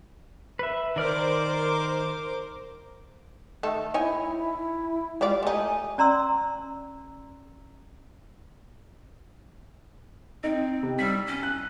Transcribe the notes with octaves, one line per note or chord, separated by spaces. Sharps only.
B4 E5
D#3 A#4 C5 D5 D6 F6
D#3 A3 A4
D#4 E4 C#5 G#5
E4
G3 G#3 F4 D5
A3 D#4 G#5
C#4 D5 A#5 C6 E6
C4 D#4
C3
G3 E6 B6
C#4
F#6